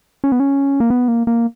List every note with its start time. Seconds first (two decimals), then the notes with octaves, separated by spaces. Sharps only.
0.24 C#4
0.32 B3
0.40 C#4
0.80 A#3
0.90 B3
1.08 A#3
1.27 A#3